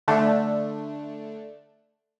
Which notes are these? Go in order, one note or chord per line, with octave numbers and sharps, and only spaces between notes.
D3 A3 D4